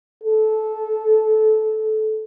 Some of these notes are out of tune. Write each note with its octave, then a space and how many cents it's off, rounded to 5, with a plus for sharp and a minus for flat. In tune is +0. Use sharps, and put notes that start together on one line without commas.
A4 -15